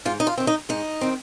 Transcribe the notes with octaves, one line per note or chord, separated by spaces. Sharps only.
G#2 F4
D#4
F4
D#3 C4
D#4
G#2 D#4
D#3 C4